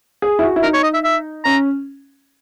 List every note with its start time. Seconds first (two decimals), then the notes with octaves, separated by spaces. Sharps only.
0.22 G#4
0.39 E4
0.43 F#4
0.56 E4
0.63 D#4 A#4
0.73 C#5
0.83 D#5
0.94 E5
1.04 E5
1.44 C#4 A#5